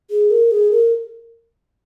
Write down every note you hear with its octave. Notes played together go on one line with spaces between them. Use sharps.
G#4
A#4
G#4
A#4